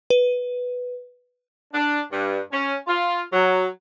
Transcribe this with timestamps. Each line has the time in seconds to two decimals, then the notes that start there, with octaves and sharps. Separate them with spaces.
0.10 B4
1.74 D4
2.12 G2
2.52 C#4
2.87 F4
3.33 F#3